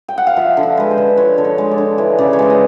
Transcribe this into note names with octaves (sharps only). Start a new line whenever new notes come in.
G5
F#5
F5
F3 E5
D3
E5
G#3 B4
C5
D3
F3 C#5
D3
C#5
G#3
D5
D3
E3 C#5
C#3 D5
C#5
G#3 D5
D#5